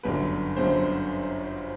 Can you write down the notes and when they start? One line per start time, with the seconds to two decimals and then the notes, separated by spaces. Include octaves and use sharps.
0.03 G1 F#2 D3 B4
0.56 G1 F#2 D3 C5